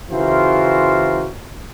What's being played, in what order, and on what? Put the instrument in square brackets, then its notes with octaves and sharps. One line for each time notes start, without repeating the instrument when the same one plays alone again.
[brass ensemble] C#3 E3 F4 F#4 A#4 C5